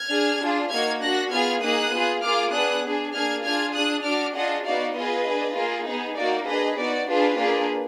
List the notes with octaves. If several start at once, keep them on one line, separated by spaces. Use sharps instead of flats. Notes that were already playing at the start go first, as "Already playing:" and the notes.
Already playing: F6 G#6
D4 G#4
D4 F4 G#4
A#3 D#4 F#4 F6 G#6
D4 F#4 F#6 A#6
B3 F4 G#4 F6 G#6
A#3 D#4 G#4 D#6 F#6
B3 F4 G#4
A#3 F4 G#4 D6 F6
B3 D4 G#4 D#6 F#6
D4 G#4
A#3 D4 G#4 F6 G#6
D4 F4 G#4 F6 G#6
D4 G#4 D#6 F#6
D4 F#4 D6 F6
D4 F4 G#4 D#5 F#5
B3 D#4 F#4 D5 F5
B3 F4 G#4 B4 D#5
D4 G#4
A#3 F4 G#4
B3 D#4 G#4
A#3 D#4 F#4 D5
D4 G#4 B4 D#5
B3 D#4 F#4 D5
D4 F4 G#4 B4
A#3 D4 F4 G#4